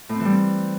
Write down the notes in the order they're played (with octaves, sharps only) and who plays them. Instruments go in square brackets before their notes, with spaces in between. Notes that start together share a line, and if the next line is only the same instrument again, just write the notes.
[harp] A2
C4
E3
G3
C4